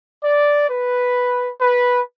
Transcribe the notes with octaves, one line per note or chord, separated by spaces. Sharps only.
D5
B4
B4